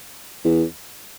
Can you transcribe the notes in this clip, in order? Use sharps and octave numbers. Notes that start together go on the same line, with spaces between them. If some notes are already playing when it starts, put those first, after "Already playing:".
E2